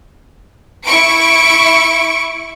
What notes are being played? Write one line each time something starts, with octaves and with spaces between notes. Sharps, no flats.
E4 C#6 D7